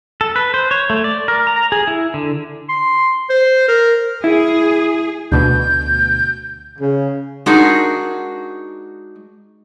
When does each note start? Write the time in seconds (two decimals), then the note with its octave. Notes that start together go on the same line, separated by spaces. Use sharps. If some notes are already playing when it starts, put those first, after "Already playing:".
0.21 A4
0.36 B4
0.54 C5
0.71 C#5
0.90 A3
1.04 D5
1.28 A#4
1.47 A#5
1.72 G#4
1.88 E4
2.14 D3
2.69 C6
3.29 C5
3.68 A#4
4.24 E4 G#4
5.32 D2 B2 G6
6.79 C#3
7.46 G#3 D4 D#4 F#4 G#4 A#4